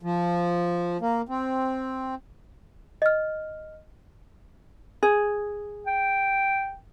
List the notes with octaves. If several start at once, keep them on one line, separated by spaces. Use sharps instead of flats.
F3
A#3
C4
D#5 F6
G#4
G5